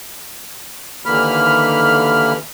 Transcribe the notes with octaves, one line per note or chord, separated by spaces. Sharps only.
D#2 D3 E3 A#3 B5 F6